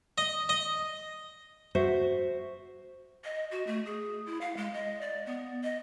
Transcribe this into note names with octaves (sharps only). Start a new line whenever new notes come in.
D#5
D#5
F#4 C5 E5
D#5
F#4
A3
G#4
E4
F5
G#3
D#5
D5
B3
D#5